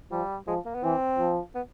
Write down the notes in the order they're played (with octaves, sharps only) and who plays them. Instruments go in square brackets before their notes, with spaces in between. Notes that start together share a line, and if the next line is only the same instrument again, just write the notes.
[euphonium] F3 [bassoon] G3
[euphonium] F3 [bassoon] G#3
[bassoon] A#3
B3
[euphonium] E3 [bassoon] C4
[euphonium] F3
[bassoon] B3